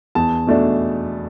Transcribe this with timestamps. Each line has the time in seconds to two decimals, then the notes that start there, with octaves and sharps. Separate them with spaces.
0.15 E2 A5
0.47 B2 A3 D4